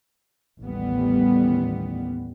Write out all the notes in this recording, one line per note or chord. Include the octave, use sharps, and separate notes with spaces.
A1 D#2 G3 B3